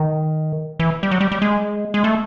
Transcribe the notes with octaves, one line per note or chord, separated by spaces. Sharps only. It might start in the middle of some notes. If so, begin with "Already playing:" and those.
Already playing: D#3
E3
G3
F#3
G3
G3
G#3
G#3
A3